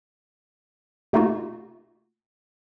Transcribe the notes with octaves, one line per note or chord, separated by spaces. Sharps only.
C3 A3 A#3 D#4 F4 F#4